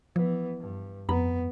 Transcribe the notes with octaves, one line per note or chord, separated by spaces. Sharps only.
E3 F3 B3
G2
F2 B3 A#5 B5